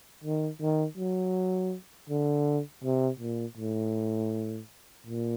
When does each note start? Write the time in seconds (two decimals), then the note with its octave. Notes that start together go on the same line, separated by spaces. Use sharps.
0.24 D#3
0.61 D#3
0.97 F#3
2.09 D3
2.84 C3
3.20 A#2
3.57 A2
5.07 A#2